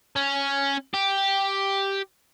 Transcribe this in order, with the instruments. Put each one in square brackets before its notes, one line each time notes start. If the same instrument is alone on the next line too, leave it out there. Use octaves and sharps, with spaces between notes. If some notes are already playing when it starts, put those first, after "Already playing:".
[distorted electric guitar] C#4
G4